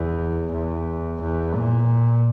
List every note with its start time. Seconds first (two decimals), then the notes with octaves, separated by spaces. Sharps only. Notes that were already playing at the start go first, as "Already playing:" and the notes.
Already playing: E2
0.52 E2
1.21 E2
1.54 A#2